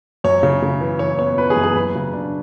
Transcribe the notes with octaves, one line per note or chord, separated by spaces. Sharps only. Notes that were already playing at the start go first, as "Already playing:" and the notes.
F#2 C#5
C#3
C#3
E3
E3 C#5
B3 C#5
E3 B4
G#4
F#2
G#4
F#2 B4
C#3
D4